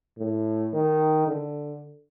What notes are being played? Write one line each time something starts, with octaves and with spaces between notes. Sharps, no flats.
A2
D#3
D3